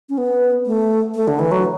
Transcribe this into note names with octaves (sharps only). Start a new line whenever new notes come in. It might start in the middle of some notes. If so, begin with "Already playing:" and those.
C#4
B3
A3
A3
D3
E3
F#3